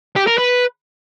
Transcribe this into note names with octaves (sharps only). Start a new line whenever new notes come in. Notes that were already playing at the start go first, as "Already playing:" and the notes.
G4
A#4
B4